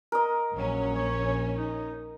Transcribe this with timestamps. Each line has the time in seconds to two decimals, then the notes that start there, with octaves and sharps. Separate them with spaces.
0.12 A#4 D#5
0.52 A#1 F#3 C#4
0.96 C#5
1.57 D#4